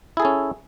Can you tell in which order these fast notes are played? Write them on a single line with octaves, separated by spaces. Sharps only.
E4 G#4 A4 C#4